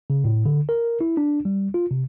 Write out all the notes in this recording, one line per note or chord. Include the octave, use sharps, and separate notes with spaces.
C#3
A2
D3
A#4
E4
D4
G3
F4
C3